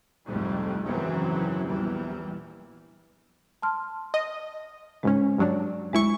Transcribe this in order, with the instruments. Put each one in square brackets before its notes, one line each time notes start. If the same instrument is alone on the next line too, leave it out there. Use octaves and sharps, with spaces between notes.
[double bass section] C2 F2 G#2 G3 A3
G#1 F#2 C#3 E3 F#3 C4
A#1 E2 E3 G3
[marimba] A5 C6 F6
[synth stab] D#5
[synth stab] C#2 G#2 C#4 [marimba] G#3
[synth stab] G2 F#3 D4
[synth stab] D2 E4 C#6 [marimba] G#3